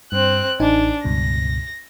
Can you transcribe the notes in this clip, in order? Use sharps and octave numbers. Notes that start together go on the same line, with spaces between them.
G2 C4 F#6
A1 D4 D#4 G#5
C#2 G2 B2 A#6